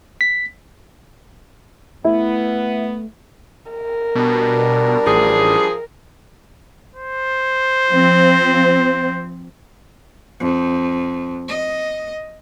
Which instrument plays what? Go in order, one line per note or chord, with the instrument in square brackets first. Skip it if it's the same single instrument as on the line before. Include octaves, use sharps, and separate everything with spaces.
[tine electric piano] B6
[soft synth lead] A3 [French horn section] B3 [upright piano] E4
[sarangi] A#4
[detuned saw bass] B2 [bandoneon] G3 D4
[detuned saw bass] A1 [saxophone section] F3 G#4
[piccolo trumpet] C5
[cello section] F3 C4
[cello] F2
D#5